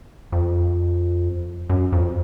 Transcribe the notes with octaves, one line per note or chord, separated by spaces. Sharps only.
F2
F#2
F2